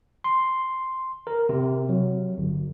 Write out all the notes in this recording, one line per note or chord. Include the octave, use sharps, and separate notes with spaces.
C6
A#4
C3
F#3
G1